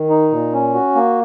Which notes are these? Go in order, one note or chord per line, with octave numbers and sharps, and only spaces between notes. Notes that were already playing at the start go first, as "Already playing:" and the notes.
Already playing: D#3
D#4
A#2
C#4
F#4
A#3